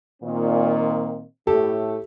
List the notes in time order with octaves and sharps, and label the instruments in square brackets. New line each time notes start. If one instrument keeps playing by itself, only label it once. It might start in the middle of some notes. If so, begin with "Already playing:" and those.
[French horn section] A#2 D#3 C4
[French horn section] A2 A3 [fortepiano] G4 A4